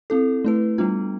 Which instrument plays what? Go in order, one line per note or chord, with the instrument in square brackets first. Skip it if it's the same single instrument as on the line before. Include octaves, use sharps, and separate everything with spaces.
[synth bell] C4 E4 A4
A3 E4 B4
G3 B3 D4 F4